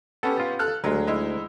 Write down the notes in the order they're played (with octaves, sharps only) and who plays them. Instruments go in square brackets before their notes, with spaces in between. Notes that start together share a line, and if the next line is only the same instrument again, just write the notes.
[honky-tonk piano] B3 C#4 G4 [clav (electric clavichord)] A4
[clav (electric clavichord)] F4
[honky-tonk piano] A4 F6 F#6
[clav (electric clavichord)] D2 [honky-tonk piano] F#3 G#3
[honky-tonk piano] G#3 D#4 E4